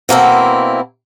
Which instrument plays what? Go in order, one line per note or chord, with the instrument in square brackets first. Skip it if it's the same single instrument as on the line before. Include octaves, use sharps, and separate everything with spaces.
[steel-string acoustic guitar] B2 A#3 C4 E4